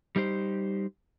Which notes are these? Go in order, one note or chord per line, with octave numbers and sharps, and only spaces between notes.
G3 D#4 G4 C5